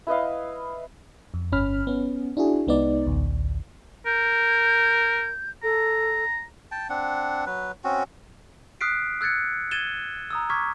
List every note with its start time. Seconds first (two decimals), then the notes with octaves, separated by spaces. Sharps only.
0.07 E4 B4 D#5 F5
1.34 F2
1.52 G1 C#4 B5 F6
1.87 B3 C#4
2.37 D4 E4 F#4 G#4
2.67 C2 G#3 B3 D#4 D5
3.07 A1 D2
4.06 A#4 G6
5.63 A4 A#5
6.71 G5 A5
6.89 C4 D4 F#5
7.46 F#3 B4
7.84 C4 C#4 F#4
8.81 D#6 F6 F#6 B6 C7 D7
9.21 E6 F#6 G#6 A6 C#7
9.71 G#6 A6 D#7 E7 G7
10.30 A#5 D#6 E6
10.50 C#6 D6 F6 G#6 B6